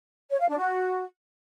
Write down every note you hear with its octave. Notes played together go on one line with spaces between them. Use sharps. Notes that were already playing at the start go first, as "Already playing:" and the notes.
C#5
F5
D4
F#4